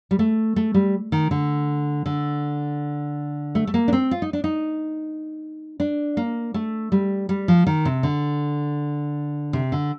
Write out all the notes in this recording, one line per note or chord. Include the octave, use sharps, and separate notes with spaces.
G3
A3
A3
G3
D#3
D3
D3
A3
A3
A#3
D4
C4
F4
D#4
D4
D#4
D4
A#3
A3
G3
G3
F3
D#3
C3
D3
C3
D3